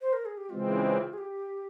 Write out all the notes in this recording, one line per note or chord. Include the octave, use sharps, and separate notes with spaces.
C5
A#4
G#4
G4
C#3 E3 G#3 C4 F4
G#4
G4